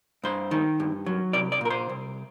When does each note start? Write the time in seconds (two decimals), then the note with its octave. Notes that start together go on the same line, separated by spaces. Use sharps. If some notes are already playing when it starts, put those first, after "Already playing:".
0.24 G2 C5
0.51 D#3
0.80 G2
1.06 F#3
1.33 C2 D5
1.52 D5
1.61 A#2 A#4
1.70 C5
1.89 C2